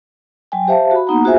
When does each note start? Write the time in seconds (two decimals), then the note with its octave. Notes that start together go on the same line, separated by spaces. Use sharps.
0.52 F#3 G5 G#5
0.68 G4 C5 E5 F5 A5
0.91 F#4 B5
1.07 A#3 B3 D#4 F#5 A#5
1.24 F4 F#4 G#4 C5 E5 G#5